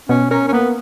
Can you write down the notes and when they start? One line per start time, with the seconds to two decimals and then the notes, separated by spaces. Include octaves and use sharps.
0.09 B2 C#4
0.30 C#4 A#4
0.48 C#4
0.53 A#3 B3